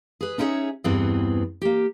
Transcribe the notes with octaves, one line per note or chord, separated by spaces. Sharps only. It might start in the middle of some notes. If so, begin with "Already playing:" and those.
G#4 B4
C#4 D#4 E4 G#4 C#5 E5
E2 G2 E3 B3 C4 G#4
A#3 G4